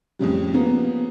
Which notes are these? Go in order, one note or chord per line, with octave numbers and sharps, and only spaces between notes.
F2 A2 C#3 G3
C#3 F3 A#3 B3